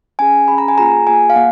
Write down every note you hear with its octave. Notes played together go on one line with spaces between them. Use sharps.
C#4 G#4 G#5
C#4 G#4 B5
A#5
G#5
A#3 F4 G#4 A#5
A#3 F4 G#4 G#5
F5
A#3 F#5